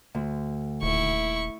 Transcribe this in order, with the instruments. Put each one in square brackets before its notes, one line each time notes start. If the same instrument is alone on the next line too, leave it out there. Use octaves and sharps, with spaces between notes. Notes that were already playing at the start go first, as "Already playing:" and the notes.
[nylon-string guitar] D2
[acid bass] D#1 [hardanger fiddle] E4 C#6